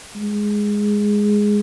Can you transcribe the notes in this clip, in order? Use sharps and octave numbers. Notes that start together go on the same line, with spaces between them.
G#3